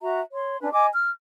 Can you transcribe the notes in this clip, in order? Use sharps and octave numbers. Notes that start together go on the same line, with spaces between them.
F#4 E5 A#5
C#5 C6
C#4 D4 B4
D#5 G#5 D6
F6